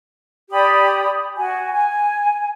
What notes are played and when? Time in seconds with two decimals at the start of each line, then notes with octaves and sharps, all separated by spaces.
0.50 G4 D5 B5 D#6
1.36 F#4 G#5
1.73 G#5